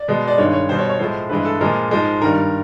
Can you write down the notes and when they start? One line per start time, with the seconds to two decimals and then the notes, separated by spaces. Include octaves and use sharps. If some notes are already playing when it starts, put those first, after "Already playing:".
Already playing: D5
0.08 B2 G#3
0.28 D5
0.38 G2 D#3 G#3 C#5
0.53 C#5
0.69 B2 G3 C5
0.78 C#5
0.89 C#5
0.99 A2 F3 G#3 C5
1.29 G2 E3 G#3 B4
1.45 A4
1.61 A#2 F3 G#3 A#4
1.91 G#2 F3 G#3
2.21 G2 D#3 G3 A#4